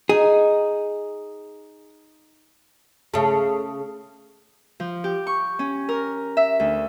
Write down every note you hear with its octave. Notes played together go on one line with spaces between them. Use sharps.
D#4 G#4
C#3 A3
F3
G4
C#6
C#4
A#4
E5
D2